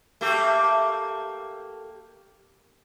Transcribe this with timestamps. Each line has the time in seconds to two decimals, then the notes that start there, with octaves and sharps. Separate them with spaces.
0.21 A3 A#3 G4